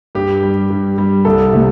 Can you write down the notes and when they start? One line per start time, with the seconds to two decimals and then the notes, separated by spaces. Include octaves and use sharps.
0.15 G2 G4
0.43 G3
0.70 G2
0.98 G3
1.25 C2 A4
1.53 C3 A3